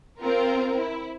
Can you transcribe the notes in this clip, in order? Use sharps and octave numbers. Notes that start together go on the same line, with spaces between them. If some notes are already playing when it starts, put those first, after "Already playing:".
C4 F4 A#4
E4